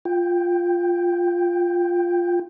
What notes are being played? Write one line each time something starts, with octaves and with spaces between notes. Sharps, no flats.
F4 G5